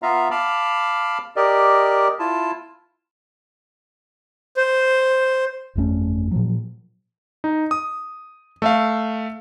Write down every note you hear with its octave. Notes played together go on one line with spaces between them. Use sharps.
B3 F4 E5 F5 A#5
F5 A5 B5 D6 F6
G4 A#4 D5 D#5
E4 F4 A5
C5
G1 F2 A3 C#4
A#2 F3 F#3
D#4
D#6
A3 E5 F5